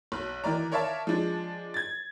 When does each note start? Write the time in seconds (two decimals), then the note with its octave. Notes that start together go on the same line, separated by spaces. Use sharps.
0.12 B1 F#6
0.44 D#3 E3 D5 A#5
0.72 A#4 C#5 D5 E5 F5 A5
1.07 F3 G#3 D4
1.74 G#6 A6